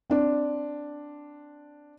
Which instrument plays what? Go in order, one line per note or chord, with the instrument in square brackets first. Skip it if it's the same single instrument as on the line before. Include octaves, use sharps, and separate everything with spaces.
[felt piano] C4 D4